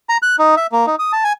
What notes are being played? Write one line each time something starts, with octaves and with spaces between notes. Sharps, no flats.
A#5
F#6
D#4
E5
A#3
D#4
D#6
A5
G#5